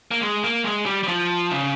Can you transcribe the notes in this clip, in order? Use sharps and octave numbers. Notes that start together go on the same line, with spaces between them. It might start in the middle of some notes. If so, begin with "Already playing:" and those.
A#3
G#3
A#3
G#3
G3
G3
F3
C#3